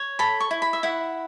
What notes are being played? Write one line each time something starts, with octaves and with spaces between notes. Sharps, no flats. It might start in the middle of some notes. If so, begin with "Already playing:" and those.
Already playing: C#5
A4 B5
C#6
E4
B5
E5
E4 F#5